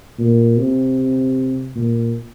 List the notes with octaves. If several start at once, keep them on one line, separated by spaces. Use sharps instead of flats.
A#2
C3
A#2